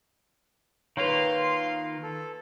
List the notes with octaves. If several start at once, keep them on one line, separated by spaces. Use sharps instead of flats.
D#3 A#3 F4 B4 C#5 F5 C6
A4